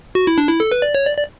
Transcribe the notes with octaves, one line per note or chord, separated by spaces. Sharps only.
F#4
E4
D4
E4
A4
B4
D5
C#5
D5
D5